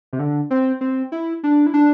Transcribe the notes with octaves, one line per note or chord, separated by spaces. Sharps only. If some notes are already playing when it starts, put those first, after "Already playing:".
C3
D3
C4
C4
E4
D4
E4
D4